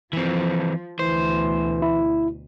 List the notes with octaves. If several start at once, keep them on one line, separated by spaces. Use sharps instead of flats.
E3 F3 C4
D2 B2 E3 C5
E4